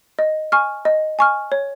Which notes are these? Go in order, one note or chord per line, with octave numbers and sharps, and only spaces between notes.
D#5
G#5 C#6 F6
D#5
G#5 C#6 F6
C#5